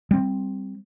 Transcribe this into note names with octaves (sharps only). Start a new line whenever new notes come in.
G3 C4